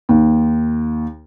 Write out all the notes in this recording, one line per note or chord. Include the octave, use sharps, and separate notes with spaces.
D#2